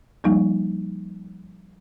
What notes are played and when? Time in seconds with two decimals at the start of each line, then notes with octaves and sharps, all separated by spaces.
0.24 F3 G3 A#3 D#4